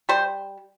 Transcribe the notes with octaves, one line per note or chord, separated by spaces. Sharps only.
G3 C5